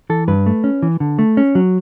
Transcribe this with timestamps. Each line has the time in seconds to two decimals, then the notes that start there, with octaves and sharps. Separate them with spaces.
0.10 E3 A4
0.28 G2 B4
0.46 A3
0.64 C#4
0.82 E3
1.00 D3
1.19 A3
1.37 C#4
1.55 F#3